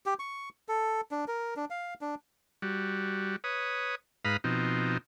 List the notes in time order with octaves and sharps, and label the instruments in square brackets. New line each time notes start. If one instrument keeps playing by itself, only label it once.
[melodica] G4
C#6
A4
D4
A#4
D4
F5
D4
[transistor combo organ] G3 F#4
B4 C#5 D#6
G#2 B4 F5 A#5 B5 D#6
B2 F3 C4 D#4